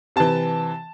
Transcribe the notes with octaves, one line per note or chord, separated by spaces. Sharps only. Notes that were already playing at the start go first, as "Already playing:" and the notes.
C3 E3 A5